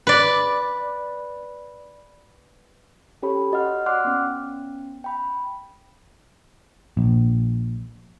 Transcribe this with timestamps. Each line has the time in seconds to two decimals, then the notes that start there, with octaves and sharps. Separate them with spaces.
0.07 B4 D5
3.22 C#4 G4 A4 C#5 B5
3.52 F#4 D#5 F#5 F6
3.86 D5 F#5 C6 D6 F6 F#6
4.05 B3 C#4
5.04 G5 B5
6.97 A#1